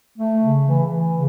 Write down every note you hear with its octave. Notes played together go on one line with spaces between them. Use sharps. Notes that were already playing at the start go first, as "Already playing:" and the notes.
A3
C#3
E3
E3
C#3